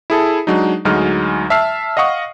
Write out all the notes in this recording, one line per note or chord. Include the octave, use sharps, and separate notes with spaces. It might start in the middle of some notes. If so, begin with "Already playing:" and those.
E4 G#4 A4
F#3 G#3 D4 D#4
D2 F#3 G#3 D#4 F6
E5 A5 E6 F6 C7
D#5 F5 F#5 C#6 D#6